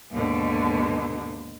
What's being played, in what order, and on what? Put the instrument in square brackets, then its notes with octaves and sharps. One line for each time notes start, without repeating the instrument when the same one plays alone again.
[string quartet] D#2 G#2 B2 D3